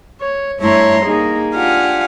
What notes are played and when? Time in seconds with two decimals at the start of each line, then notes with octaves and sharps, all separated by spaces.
0.21 C#5
0.60 G2 A3 E4 C#5 A#5 C6
1.05 A#3 D#4 G#4
1.54 D4 F4 G4 F5 F#5 G#5